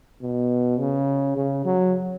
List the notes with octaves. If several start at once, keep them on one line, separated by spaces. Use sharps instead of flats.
B2
C#3
C#3
F#3